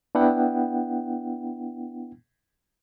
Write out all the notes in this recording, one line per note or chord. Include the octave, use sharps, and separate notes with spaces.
B3 D4 E4 F#5 G5